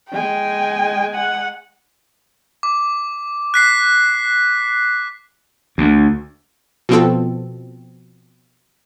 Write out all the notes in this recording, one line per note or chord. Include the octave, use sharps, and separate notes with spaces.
G#3 G5 G#5
F#5
D6
F#6 B6 C7
D2
B2 F3 B3 C4 F4 A4